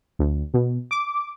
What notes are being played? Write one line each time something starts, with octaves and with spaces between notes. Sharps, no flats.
D2
B2
D6